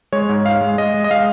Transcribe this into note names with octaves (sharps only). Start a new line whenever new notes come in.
G#3 C#5
G#2
G#2 F5
G#3
G#3 D#5
G#3
D#5
G#3 F5